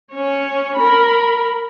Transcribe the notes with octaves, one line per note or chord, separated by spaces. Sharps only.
C#4 C#5
A#4 B5